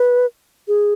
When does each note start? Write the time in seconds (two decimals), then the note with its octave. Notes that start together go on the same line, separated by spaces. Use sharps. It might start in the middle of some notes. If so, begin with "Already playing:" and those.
Already playing: B4
0.68 G#4